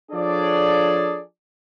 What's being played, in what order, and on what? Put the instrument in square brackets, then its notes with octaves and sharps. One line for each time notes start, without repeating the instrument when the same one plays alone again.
[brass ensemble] F3 D4 G#4 A4 C#5 D5